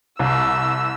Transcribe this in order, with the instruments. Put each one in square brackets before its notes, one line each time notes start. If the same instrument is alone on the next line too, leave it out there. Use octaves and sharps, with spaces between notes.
[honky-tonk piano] C2 [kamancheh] E6